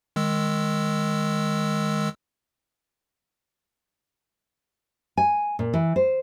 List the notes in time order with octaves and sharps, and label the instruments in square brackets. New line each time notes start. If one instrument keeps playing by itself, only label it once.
[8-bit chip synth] D#3 G#3 E6
[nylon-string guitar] G#5
A#2
E3
C5